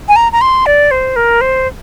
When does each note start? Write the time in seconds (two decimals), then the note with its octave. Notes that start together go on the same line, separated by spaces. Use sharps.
0.08 G#5
0.16 A#5
0.32 A#5
0.41 C6
0.66 D5
0.91 C5
1.16 A#4
1.41 C5